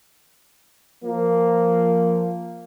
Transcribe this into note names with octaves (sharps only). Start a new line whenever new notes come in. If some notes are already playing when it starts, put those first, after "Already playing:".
F3 A#3